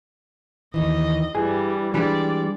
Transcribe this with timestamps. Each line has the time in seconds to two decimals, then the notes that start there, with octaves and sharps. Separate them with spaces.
0.74 D#2 D#3 E3 D#5
1.35 G2 E3 G3 G#4
1.94 E3 G3 G#3 D4 D5